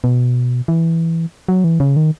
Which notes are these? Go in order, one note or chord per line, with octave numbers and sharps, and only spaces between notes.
B2
E3
F#3
E3
C#3
D#3